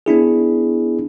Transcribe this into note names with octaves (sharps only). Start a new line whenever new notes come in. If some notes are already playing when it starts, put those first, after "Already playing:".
B3 D4 E4 G#4